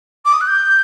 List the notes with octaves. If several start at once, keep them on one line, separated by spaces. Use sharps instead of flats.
D6
D#6
F#6
G6